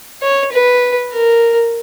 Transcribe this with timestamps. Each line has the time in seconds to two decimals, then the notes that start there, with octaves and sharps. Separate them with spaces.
0.22 C#5
0.52 B4
1.13 A#4